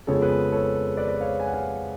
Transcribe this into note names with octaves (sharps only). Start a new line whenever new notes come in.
F2 C#3 F3 G#3 B3 A4 C#5
G#4 B4
A4 C#5
B4 D5
B4 D5
C#5 F5
G#5
F#5
F5 G#5